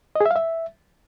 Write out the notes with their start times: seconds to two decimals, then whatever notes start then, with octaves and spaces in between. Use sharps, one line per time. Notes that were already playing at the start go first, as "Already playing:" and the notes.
0.16 D#5
0.21 G#4
0.26 E5
0.31 F5
0.36 E5